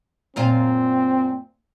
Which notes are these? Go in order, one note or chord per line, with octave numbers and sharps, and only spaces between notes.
F#2 A#2 C4 F4